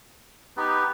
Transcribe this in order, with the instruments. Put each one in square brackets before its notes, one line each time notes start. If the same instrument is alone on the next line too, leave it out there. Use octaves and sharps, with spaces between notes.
[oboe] B3 [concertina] D#4 G4